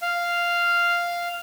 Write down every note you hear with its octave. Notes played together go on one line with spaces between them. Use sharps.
F5